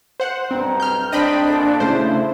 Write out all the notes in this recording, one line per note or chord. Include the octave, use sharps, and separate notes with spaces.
C5 F#5
B1 G2 C4 A#5
F6 G6
G#2 C4 D4 D#5 G5 B5
A#2 A4
C#3 A3 E4 C5